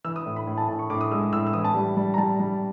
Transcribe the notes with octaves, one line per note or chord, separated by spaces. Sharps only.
E3 E6
D#6
A2
B5
A2
A5
A2 A5
C#6
A2 D6
D#6
G#3 E6
A2 E6
E6
E3 D#6
A5
G3
G3
A#5
G3 A5
G3